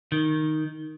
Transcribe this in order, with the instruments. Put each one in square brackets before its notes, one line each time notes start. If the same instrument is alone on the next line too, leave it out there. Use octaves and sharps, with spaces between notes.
[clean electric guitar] D#3